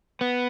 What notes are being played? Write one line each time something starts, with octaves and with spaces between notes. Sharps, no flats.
B3